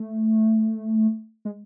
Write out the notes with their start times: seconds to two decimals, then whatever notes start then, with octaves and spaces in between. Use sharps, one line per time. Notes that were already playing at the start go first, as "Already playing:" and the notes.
Already playing: A3
1.45 G#3